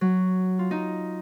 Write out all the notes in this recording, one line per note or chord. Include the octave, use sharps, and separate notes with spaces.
F#3
F4
D#4